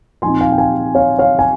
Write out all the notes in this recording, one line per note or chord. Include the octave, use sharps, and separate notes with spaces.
A#2 F3 C4 D#4 G#5 C6
F5 G#5
G5
F5 G#5
C#5 F5
C#5 F5
G#5